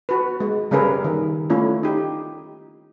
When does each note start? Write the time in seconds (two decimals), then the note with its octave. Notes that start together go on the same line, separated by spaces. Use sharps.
0.09 F#4 B4
0.40 G#3
0.71 C#3 G3 C#4 G#4 A#4 B4
1.04 D#3
1.50 A3 C#4 E4 F4
1.83 D#4 G4